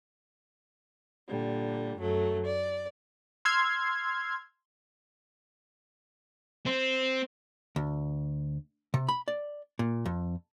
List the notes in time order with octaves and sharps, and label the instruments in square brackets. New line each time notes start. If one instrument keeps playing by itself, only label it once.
[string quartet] A#2 D3 G3
F#2 F#3 A3
D5
[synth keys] C6 E6 F6 G#6 C7
[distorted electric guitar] C4
[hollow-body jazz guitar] D2
C3
B5
D5
A#2
F2